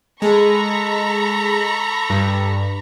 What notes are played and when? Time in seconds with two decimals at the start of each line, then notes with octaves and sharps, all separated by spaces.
0.22 G#3 A4 A#5 B5 C#6
2.10 G2